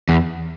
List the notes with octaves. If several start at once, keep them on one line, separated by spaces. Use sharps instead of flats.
E2